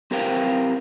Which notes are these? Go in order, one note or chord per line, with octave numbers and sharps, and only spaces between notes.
C4 G4 A#4 C5 F5 G5